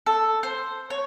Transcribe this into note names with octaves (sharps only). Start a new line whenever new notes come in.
A4
C5
C#5